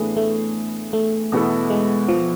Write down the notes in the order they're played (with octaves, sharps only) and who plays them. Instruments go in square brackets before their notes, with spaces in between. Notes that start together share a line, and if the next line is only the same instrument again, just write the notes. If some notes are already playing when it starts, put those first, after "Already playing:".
Already playing: [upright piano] A2 E3 B3 D4 G#4 [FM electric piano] A3
[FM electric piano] A3
A3
[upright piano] E2 B2 B3 E4 A4
[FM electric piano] G#3
F3